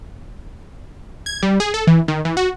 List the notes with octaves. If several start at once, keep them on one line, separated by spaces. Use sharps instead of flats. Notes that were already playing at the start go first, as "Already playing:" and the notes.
G#6
G3
G#4
A4
E3
D#3
E3
F#4